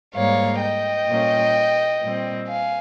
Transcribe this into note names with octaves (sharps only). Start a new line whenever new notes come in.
G#2 G3 A#3 C#5 F5
D#5 G5
A#2 G3 A#3 C#4
A#2 G3 C4
F5 G#5